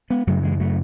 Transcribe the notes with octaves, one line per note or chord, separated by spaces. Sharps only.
G#3 B3
F#2 C#3 F#3 A3
E3 G#3
F#3 A3